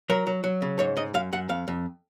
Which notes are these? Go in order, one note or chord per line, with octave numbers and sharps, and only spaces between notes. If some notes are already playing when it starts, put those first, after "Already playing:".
F#3 A#4
F#3
F#3
C#3
G#2 C#5
G#2 D#5
F#2 F5
F#2 F#5
F2 F5
F2